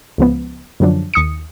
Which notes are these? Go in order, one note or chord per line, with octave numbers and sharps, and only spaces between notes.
C#2 F3 B3
F#2 D3 F3 F#3 D4
D#2 D#6 C#7